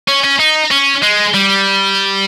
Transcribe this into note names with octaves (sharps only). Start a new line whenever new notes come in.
C#4
C#4
D#4
C#4
G#3
G3